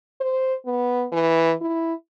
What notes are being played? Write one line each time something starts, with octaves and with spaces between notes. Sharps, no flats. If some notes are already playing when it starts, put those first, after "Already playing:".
C5
B3
E3
E4